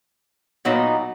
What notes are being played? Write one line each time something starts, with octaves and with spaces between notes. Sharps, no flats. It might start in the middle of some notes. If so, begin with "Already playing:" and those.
A#2 F#3 B3 D#4